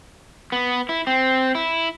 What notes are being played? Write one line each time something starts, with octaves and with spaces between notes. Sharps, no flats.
B3
E4
C4
E4